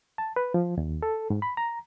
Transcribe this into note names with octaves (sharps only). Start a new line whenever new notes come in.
A5
B4
F3
D#2
A4
G#2
B5
A#5